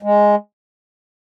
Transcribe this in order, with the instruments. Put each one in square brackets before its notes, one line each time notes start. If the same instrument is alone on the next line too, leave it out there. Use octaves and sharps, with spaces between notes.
[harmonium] G#3